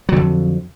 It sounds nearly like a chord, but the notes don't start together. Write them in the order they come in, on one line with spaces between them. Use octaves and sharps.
F#3 D3 F2